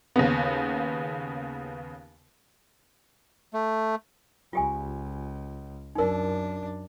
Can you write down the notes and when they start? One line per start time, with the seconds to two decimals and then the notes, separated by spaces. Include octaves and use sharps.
0.16 D#2 C#3 B3
3.54 A3
4.53 C#2 F4 G4 G#5
5.95 F#2 D4 D#4 A#4